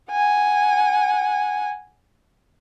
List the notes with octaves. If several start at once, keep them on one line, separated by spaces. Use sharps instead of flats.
F#5 G#5